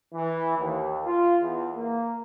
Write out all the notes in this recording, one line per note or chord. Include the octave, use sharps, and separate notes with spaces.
E3
D#2
F4
E2
A#3